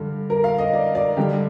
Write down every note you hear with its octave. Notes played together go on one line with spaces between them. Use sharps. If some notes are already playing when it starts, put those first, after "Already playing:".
Already playing: G2 D3
A#4
F5
D#5
D5
D5
G2 D3 G4